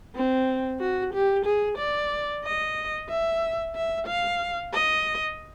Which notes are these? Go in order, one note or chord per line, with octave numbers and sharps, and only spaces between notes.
C4
F#4
G4
G#4
D5
D#5
E5
E5
F5
D#5